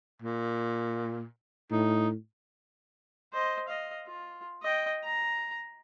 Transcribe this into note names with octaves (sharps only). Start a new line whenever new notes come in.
A#2
A2 D#4
C5 D#5
D#5 F5
F4
D#5 G5
A#5